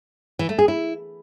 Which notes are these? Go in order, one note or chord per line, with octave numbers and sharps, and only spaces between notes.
E3
A3
G#4
E4